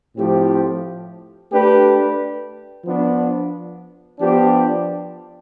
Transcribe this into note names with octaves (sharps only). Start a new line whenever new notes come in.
A2 F3 C4 G4
A3 D4 G4 B4
F3 B3 D4
F3 B3 D4 G4